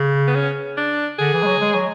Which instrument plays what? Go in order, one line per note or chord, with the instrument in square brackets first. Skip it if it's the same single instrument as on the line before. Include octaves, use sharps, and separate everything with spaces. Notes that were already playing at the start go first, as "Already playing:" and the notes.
Already playing: [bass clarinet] C#3
[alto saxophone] B3
C#4
D4
[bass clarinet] D3 [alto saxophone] G#4
[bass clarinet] E3
G#3
F#3
G#3
F#3